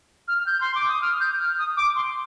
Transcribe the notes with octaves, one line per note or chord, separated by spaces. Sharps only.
F6
F6
G6
C6
D6
D#6
F6
G6
F6
D#6
D6
C6